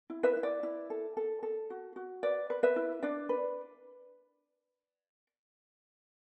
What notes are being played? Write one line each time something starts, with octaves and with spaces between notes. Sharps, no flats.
E4
B4 E5
E4
D5
E4
A4
A4
A4
F#4
F#4
B4 D5
B4
B4 E5
E4
D4 D5
B4